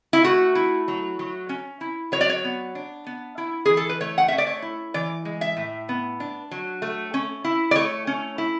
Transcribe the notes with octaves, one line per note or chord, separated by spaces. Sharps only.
E4
A3 F#4
E4
F#3
F#3
C#4
E4
F#3 C#5
D5
C#5
B3
D4
B3
E4
E3 G#4
A4
B4
A3 C#5
F#5
C#4 E5
D5
C#5
E4
E3 D5
G#3
E5
A2
B3
D4
F#3
A3
C#4
E4
D5
A3 C#5
C#4
E4